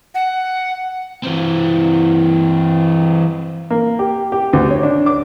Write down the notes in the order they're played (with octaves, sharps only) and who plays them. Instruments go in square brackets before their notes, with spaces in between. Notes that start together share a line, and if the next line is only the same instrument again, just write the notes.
[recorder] F#5
[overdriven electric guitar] E3 C4
[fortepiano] A#3
G4
G4
D2
C#5
D4
D6